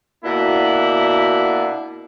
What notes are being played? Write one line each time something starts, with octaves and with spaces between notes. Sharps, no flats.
B2 A#3 D4 E4